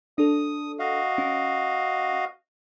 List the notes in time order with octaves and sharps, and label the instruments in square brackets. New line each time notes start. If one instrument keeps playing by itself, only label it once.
[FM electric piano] D4 A4 [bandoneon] D#6
[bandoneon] F#4 D#5 F5
[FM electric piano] C#4